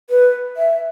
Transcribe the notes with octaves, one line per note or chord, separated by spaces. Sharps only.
B4
E5